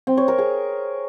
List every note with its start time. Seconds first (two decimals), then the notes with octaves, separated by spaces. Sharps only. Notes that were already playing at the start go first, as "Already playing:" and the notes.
0.07 C4
0.17 C#5
0.28 A#4
0.38 G#4